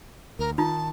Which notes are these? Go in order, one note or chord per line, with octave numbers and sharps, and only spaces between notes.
D2 A#4
D#3 D#4 F4 A5 A#5